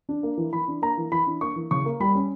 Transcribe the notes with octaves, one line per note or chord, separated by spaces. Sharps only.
D4
A#3
E3
E3 B5
D4
A#3 A#5
E3
E3 B5
D4
A#3 C#6
E3
C#3 C#6
A#3
G3 B5
C#4